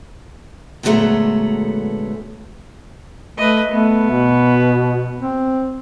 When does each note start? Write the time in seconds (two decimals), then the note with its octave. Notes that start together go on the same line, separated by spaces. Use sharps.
0.83 A#2 D3 F#3 G#3 A3 B3
3.37 A3 B4 D#5
3.71 A3 B3
4.10 B2
5.20 C4